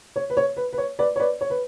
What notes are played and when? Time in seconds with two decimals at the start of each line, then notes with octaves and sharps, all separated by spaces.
0.16 C#5
0.30 B4
0.37 C#5
0.57 B4
0.73 B4
0.78 C#5
0.99 B4 D5
1.16 C#5
1.19 B4 D5
1.41 C#5
1.50 B4